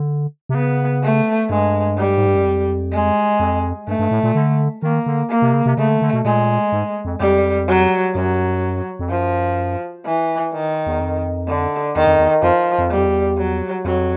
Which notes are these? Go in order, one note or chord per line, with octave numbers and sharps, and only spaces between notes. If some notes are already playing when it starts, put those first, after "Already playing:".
Already playing: D3
C3
C#3 B3
A3
G2 G#3
G3
G#2
G2
F#2
F2
G#3
F2
G2 A3
G2
A2
A#2
D3
D#3 A#3
D3
A#3
C3
C#3
C3
C#3 A3
D3
D3
B2
A#2 G#3
G#2
F2
F2 G3
F#3
F#2 F#3
F2
F#2 F3
E3
D#3
E2
F2
D3
E2 D#3
F2
E2
F2 F3
F2
E2 G3
F2
E2
F#3
F2 F#3